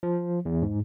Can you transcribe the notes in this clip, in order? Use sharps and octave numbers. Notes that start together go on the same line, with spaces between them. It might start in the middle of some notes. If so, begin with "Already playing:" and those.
F3
E2
G#2